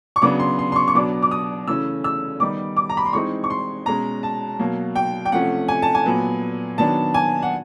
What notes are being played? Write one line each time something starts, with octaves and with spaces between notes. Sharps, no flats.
C#6
C#3 F#3 B3 D4 D6
C6
C6
C6
C#6
C#6
B2 F#3 B3 D4 D6
D6
D#6
C#3 E3 A3 C#4 E6
E6
D#3 G3 B3 D#4 D6
D6
A#5
B5
C6
E3 G#3 C4 D#4 C#6
C#6
C6
B2 G#3 C#4 A#5
A5
B2 F#3 A#3
G5
G5
C3 F3 A3 C#4 F#5
G#5
A5
G#5
A#2 F#3 B3
D#3 F#3 B3 D4 A5
G#5
F#5